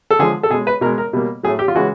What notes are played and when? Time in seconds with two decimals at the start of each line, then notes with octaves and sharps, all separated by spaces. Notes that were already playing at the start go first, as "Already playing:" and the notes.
0.10 A4
0.19 D3 F3 G#3 G#4
0.43 A4
0.50 B2 G#4
0.54 G#3
0.67 B4
0.81 B2 A#4
0.86 G#3
0.98 A#4
1.13 B2 G3 A#3
1.43 A2 F#3 A3 G#4
1.59 G4
1.68 F4
1.75 C#3 E3 G#3 F#4